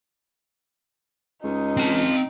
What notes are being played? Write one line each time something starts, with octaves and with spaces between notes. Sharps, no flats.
C#2 D#4
C4 A5